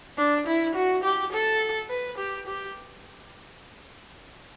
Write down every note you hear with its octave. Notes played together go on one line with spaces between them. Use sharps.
D4
E4
F#4
G4
A4
B4
G4
G4